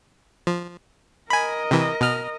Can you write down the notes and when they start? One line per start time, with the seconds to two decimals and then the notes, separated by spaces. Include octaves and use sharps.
0.47 F3
1.30 A#4 D#5 G#5 B5
1.71 C3 E3
2.01 B2 F6